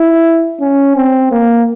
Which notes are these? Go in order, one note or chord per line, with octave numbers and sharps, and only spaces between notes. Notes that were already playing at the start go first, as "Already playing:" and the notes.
Already playing: E4
C#4
C4
A#3